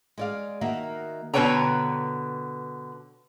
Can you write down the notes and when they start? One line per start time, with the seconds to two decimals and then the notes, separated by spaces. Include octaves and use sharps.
0.18 G#3 D5 F5
0.61 D#3 A#3 F#4 E5
1.34 B2 D3 B4 C#5 G5 A#5